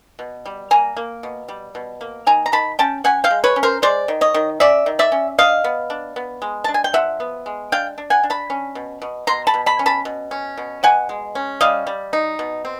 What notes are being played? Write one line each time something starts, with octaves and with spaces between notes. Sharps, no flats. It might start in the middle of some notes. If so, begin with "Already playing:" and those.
B2
G3
A#3 G#5 A#5
A#3
B2
G3
B2
A#3
D#3 G#5 A#5
A#5
D#3 A5 B5
C#4 G5 A5
C#4 F#5 G#5
F5 G5
G#3
B4 C#5
C#4
A#4 C5
G#3 C5 D5
D#3
C#5 D#5
D#3
C#4 D5 E5
D#3
D5 E5
C#4
D4 D#5 F5
B3
D4
B3
G#3
D4 A5
G#5
G5
F3 E5 F#5
B3
G#3
D4 F5 G5
D4
F#5 G#5
D4
A5 B5
C#4
B2
B2
B2 A#5 C6
A5 B5
B2
A5 B5
C#4
A5 B5
B2
C#4
B2
B2 F#5 G#5
G#3
C#4
G3 D#5 F5
G3
D#4
B2
C4